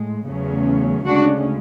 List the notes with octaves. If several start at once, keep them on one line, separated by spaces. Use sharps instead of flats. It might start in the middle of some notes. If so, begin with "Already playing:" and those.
Already playing: A2 G#3
E2 C#3 F#3 A3 C#4
D2 C#3 G#3 C#4 D4 F#4